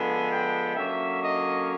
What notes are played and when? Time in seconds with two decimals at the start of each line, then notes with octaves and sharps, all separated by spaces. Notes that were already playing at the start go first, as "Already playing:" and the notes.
Already playing: D3 F3 G#3 B3 G#5
0.30 G5
0.76 D3 F#3 A#3 C#4 E5
1.23 D#5